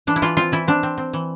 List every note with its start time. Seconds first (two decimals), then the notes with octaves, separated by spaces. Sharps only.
0.07 E3 D4
0.16 E4
0.22 E3 F4
0.37 C4 F4
0.52 E3 E4
0.68 C4 D4
0.83 C4
0.98 C4
1.13 E3